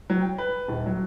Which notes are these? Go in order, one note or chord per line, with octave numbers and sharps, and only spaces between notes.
F#3
G5
B4
D#1
F#3